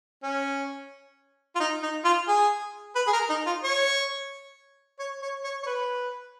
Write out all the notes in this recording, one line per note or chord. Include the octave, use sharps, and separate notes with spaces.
C#4
F4
D#4
D#4
F4
G#4
B4
G#4
A#4
D#4
F4
C#5
C#5
C#5
C#5
C#5
B4